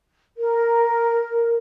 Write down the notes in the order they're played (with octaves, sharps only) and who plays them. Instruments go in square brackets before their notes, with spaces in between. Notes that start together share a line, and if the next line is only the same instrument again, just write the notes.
[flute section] A#4